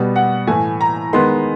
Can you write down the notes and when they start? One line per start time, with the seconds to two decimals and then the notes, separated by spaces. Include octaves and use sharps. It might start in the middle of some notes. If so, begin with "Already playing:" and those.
Already playing: B2 G3 B3
0.16 F#5
0.47 A2 E3 A3 G#5
0.81 A#5
1.13 D#3 G#3 B3 C6